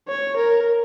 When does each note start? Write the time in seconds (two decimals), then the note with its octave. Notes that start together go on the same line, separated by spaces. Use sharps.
0.08 C#5
0.37 A#4